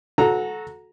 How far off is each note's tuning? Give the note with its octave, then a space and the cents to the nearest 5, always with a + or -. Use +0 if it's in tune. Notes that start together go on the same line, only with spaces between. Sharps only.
F#4 -15 A4 -20 A#5 +0